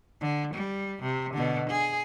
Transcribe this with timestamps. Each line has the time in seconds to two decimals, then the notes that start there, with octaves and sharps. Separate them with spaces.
0.21 D3
0.54 G3
1.02 C3
1.33 B2 D3
1.69 G#4